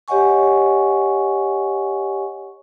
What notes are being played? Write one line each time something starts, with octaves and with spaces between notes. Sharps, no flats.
G4 C#5 D#5 F#5 G#5 C#6